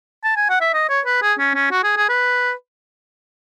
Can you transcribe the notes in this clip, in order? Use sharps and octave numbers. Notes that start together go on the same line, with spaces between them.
A5
G#5
F#5
E5
D#5
C#5
B4
G#4
C#4
C#4
F#4
G#4
G#4
B4